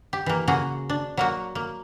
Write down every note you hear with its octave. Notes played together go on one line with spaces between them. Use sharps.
G4
E3 A#3
C#3 A#3 F#4 G#4
D4
F#3 A#3 F#4
A#3